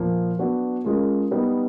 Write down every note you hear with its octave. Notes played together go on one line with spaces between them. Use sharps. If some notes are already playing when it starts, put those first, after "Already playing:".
Already playing: A#2 F3 A#3
F#3 B3 D4 F#4
G#3 C#4 F4 A#4
G3 B3 D#4